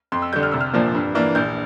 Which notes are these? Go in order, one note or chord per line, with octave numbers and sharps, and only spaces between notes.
F2 C6
E6
D3 G3 G6
F6
C2 E6
F6
A#2 F3 A#3 D4
G2
E3 A#3 D4
A#1 G6